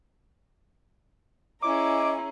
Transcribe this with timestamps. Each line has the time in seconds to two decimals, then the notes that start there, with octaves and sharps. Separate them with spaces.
1.62 C#4 E4 G#4 D#5 A#5 D6